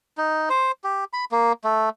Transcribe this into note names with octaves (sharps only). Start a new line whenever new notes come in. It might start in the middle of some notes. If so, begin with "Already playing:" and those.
D#4
C5
G4
B5
A#3
A3